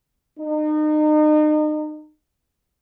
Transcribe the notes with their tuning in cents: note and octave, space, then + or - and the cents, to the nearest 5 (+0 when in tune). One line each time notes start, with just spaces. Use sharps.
D#4 -35